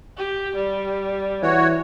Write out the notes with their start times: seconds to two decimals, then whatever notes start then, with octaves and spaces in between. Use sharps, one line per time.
0.18 G4
0.56 G3
1.43 E3 F#4 C#5